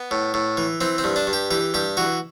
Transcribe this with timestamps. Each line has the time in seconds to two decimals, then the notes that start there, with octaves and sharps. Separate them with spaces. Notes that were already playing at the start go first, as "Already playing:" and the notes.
Already playing: B3
0.11 A2
0.34 A2
0.57 E3
0.81 E3 C4
0.98 C4
1.04 G2
1.16 D4
1.27 G2
1.33 G4
1.51 E3 G4
1.74 G2 G4
1.97 E3 F#4